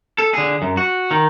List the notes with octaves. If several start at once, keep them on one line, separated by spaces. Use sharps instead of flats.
A4
D3 G#4
F#2
F#4
D#3